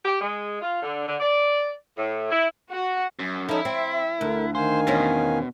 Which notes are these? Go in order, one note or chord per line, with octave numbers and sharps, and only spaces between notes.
G4
G#3
F4
D3
D3
D5
A2
E4
F#4
F#2
F3 C#4 D#4 E4 A4
C4 E5
D2 A3 A#4
D#3 C5 F5 G#5
E2 B2 C4 C#4